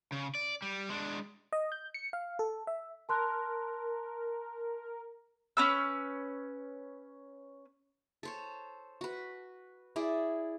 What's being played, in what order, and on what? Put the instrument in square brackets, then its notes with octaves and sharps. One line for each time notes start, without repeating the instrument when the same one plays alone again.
[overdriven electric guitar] C#3
D5
G3
G#3 D4
[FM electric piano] D#5
G6
C#7
F5
A4
E5
[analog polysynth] A#4 [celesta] A5 C6 F#6
[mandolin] C#4 B4 E6
[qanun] A4 C5 C#5
F#4 B4
E4 G#4 D5